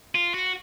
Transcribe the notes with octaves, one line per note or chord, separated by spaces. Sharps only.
F4
F#4